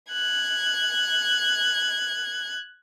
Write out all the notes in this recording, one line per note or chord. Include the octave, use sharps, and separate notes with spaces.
F#6 G#6